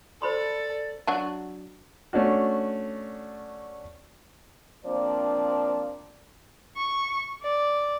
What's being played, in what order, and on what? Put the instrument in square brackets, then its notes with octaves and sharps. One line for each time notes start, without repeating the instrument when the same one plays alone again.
[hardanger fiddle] A4 [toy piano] C5 B5 C6 [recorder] D5
[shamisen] F#3 D4 F#4
[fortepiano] A3 C#4 D4 F#4
[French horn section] F3 A#3 C4 D4 D5
[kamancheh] C#6
D5